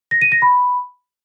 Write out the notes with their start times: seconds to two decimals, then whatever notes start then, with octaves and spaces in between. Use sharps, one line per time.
0.11 A#6
0.22 D#7
0.32 A#6
0.42 B5